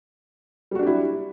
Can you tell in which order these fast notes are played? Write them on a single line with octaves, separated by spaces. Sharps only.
G3 F#4 D4 G4 E4